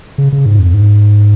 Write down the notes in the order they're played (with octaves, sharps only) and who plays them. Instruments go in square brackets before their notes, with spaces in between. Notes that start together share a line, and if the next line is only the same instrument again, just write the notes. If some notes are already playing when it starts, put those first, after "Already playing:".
[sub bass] C#3
C#3
G#2
F2
G#2